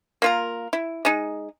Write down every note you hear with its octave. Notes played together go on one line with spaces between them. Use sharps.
A#3 F4 A#4
E4
G#3 D#4